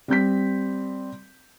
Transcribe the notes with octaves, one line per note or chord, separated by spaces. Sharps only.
G3 C4 G6 B6